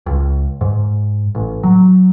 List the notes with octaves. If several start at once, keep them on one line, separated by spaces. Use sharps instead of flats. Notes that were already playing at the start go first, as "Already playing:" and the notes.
C#2
G#2
A1
F#3